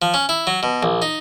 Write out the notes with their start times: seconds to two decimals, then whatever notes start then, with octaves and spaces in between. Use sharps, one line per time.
0.02 F3
0.14 C#4
0.29 E4
0.47 F#3
0.63 B2
0.83 A#1
1.02 D#4